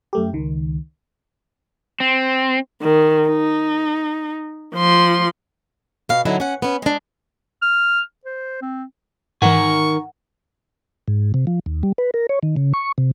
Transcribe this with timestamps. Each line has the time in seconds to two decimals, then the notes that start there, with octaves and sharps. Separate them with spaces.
0.13 F#2 A3 G4
0.33 C#2 D#3
2.00 C4
2.81 D#3
3.29 D#4
4.76 F3 C6
6.09 B2 F5
6.25 D3 F#3 D#4 E4
6.40 C#4 F#5
6.62 B3 C#4
6.82 G#3 D4
7.62 F6
8.26 C5
8.62 C4
9.42 G#2 D#3 E3 A#4 F#5 G#5 C#6
11.08 G#2
11.34 C3
11.47 F3
11.66 D#2
11.83 G3
11.98 B4
12.14 A#4
12.29 C#5
12.43 D#3
12.56 C#3
12.74 C#6
12.98 C3